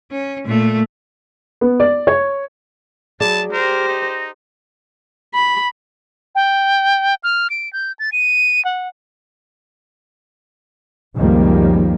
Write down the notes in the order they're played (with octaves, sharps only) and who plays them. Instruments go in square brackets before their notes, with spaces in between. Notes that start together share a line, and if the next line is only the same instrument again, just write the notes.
[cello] C#4
A#2 A3
[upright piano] B3
D5
C#5
[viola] F#3 [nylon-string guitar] G#4 D5 [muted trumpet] A5 [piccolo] B5
[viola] G4 C5 [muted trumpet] A#4 [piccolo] A#6
[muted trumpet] D#4
[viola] B5
[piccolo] G5
F6
D7
G6
A6
D#7
F#5
[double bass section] C#2 F#2 D#3 F3 G3 A#3